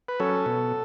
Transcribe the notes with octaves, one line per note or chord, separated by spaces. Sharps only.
B4
F#3 C#4 A4
B2